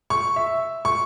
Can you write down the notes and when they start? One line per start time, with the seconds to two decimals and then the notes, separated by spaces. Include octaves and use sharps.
0.10 C#6
0.36 E5
0.85 C#6